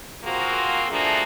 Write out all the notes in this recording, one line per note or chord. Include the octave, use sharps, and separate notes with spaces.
F3 A#3 C4 F#4 G#4 A#4
F3 A3 A#3 D4 F#4 G#4